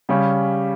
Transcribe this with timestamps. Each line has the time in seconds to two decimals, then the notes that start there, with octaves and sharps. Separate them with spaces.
0.09 C#3 G3 C#4